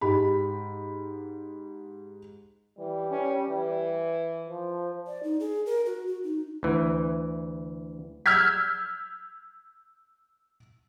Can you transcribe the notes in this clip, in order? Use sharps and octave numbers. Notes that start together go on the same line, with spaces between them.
G#2 G4 B5
E3 G3
C#4
E3
F3
D5
D#4
G#4
A#4
F#4
F#4
D#4
D2 E3
E6 F6 G6 G#6 B6